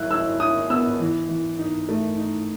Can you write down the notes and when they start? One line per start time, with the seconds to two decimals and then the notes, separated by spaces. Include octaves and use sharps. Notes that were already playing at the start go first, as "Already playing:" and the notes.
Already playing: F#3 E4 F#6
0.11 E4 E6
0.40 E4 D#6
0.70 B3 E6
1.00 E3
1.29 E3
1.59 D#4
1.89 A3
2.18 D#4